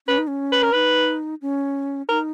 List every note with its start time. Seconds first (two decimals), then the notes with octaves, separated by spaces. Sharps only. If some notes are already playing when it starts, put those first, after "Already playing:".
0.07 C#4 B4
0.18 D#4
0.27 C#4
0.52 B4
0.63 A#4
0.72 D#4 B4
1.42 C#4
2.09 D#4 A#4